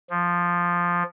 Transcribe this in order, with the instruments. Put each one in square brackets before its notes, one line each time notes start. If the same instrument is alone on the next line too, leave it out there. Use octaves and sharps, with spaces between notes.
[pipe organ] F3